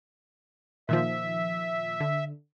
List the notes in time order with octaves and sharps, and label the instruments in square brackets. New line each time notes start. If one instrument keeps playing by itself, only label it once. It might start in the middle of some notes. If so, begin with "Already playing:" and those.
[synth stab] A#2 D#3 F3 [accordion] E5
[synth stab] D3